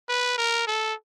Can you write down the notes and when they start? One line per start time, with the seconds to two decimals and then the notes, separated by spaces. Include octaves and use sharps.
0.09 B4
0.38 A#4
0.67 A4